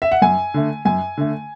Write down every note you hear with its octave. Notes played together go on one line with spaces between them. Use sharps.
E5
F#5
F#2 G#5
D3 A3
F#2 G#5
D3 A3